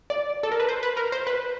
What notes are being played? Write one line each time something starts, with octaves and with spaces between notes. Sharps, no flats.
D5
A4
A#4
B4
C5
B4
A#4
C5
B4